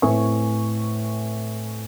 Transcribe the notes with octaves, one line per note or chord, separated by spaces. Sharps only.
A2 C4 B4 E5 G#5 C#6